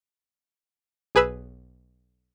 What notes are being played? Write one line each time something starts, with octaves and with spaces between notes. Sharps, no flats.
B1 G#4 B4 B5 E6